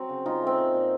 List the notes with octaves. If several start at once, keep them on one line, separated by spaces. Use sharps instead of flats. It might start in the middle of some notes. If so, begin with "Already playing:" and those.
Already playing: F#3 C4
C#3
C#3 D#4 F4
A3
C4
A#2
A#2